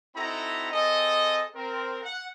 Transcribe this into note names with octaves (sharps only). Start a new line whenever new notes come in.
C4 D#4 E4 F#4 A4 A#5
C4 G#4 A4 D#5
C4 A#4
F#5